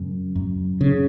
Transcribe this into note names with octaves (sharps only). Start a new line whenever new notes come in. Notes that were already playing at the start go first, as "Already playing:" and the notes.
Already playing: F#2 C#3
F#2
C#3